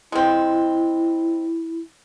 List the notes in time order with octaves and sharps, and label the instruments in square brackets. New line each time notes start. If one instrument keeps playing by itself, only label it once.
[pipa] G#3 C4 [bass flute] E4